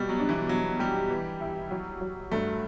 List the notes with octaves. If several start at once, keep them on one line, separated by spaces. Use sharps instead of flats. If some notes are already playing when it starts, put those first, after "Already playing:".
Already playing: B2 G3
F#3
D4
E3
B2 F#3
G3 G4
E3
E4
F#3
F#3
G2 A3